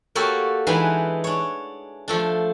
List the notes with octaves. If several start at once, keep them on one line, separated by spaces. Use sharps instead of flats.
A#3 F#4 G4 A4 C#5
E3 G#3 D4 D#4 G#4 B4
D4 C#5
F3 A3 D4